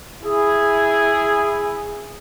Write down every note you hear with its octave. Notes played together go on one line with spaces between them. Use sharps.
E4 G#4